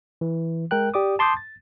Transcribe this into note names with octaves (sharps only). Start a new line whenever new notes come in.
E3
G#3 A#4 G5 F#6
G4 D5 D6 D#6
A5 C6 D6 D#6 G6
A6